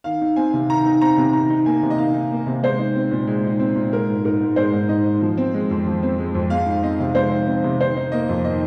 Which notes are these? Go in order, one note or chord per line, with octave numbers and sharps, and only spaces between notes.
D#3 F5
D#4
C4 G#5
C3
D#3 A#5
D#4
C4 A#5
C3
D#3 A#5
D#4
A#3 G#5
C3
D#5
D#3 F5
D#4
A#3
C3
G#3 C5
D#4
C4
A#2
G#3
D#4
C4
A#2
G#3 A#4
G#2
D#4 A#4
G#2
G#3 C5
G#2
D#4 D#5
G#2
F3
C4
G#3
F2
F3
C4
G#3
F2
G#3 F5
D#4
C4 D#5
C3
G#3 C5
D#4
C4
C3
D#3 C5
D#4
A#3 D#5
F2
D#3 D#5